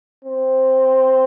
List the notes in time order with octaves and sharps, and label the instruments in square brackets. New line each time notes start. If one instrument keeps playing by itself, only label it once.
[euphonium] C4